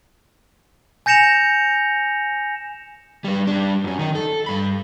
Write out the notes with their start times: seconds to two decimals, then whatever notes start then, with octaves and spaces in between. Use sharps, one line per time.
1.06 G#5 G6 A#6 C#7 E7 F7
3.24 G3 B4
3.47 G3 D4
3.84 F#2 C#4
3.99 D#3 D#4
4.15 A4
4.46 G2 B5